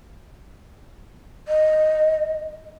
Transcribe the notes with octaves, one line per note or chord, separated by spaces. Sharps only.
D#5